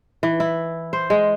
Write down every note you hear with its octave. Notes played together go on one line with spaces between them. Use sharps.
E3
E4
C5
G#3